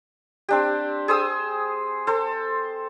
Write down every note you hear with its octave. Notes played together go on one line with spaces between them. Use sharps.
C4 D4 G4
G#4 C5 D#6 E6
A4 C5